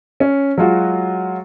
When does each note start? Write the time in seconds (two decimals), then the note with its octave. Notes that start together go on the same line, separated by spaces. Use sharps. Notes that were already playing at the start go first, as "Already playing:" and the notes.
0.20 C#4
0.58 F#3 G#3 F4 F#4 G#4